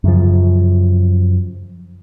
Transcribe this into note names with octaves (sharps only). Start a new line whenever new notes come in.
F#2 C#3 F3